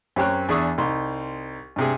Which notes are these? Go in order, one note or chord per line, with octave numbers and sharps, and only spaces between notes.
F#2 C4 G4 C#5 A#5 F#6
E2 D4 G#4 E5 C#6 D#6
C2 D#4 C6
G2 C3 G#4